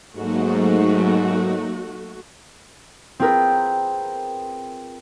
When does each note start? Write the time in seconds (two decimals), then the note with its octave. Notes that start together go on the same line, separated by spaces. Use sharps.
0.16 G#2 F#3 A3 A#3 D#4 F#4
3.20 C4 F4 G#4 A#4 B4